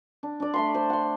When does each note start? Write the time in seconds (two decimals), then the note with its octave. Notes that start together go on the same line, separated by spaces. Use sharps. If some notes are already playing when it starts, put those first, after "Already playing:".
0.23 D4
0.40 D4 D5
0.54 A3 B5 C6
0.75 C5
0.90 F#5 C6